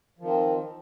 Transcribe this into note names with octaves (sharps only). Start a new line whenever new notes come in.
D#3 F3 C4